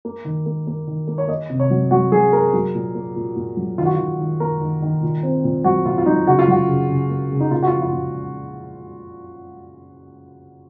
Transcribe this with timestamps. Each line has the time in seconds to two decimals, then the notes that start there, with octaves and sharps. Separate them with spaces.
0.05 A#3
0.25 D#3
0.46 A#3
0.67 A#3
0.87 D#3
1.08 A#3
1.18 C#5
1.28 A#3 D#5
1.49 C3
1.60 C#5
1.71 F#3
1.91 F#3 F#4
2.12 F#3 G#4
2.33 A#3 A#4
2.53 F#3
2.75 A#2
2.95 A#3
3.16 A#2
3.36 A#2
3.57 F#3
3.78 D#3 F4
3.85 F#4
3.93 D#3 F4
4.19 D#3
4.40 A#3 A#4
4.61 D#3
4.82 D#3
5.02 A#2
5.23 C4
5.44 A#2
5.64 F#3 F#4
5.85 A#2 F4
5.98 F4
6.06 F#3 D#4
6.27 C#3 F#4
6.39 F4
6.48 F#3 F#4
6.68 C#3
6.90 C#3
7.10 A#3
7.31 C#3
7.40 D#4
7.51 A#2 F4
7.63 F#4
7.67 F3 F4
7.82 F4
7.93 A#2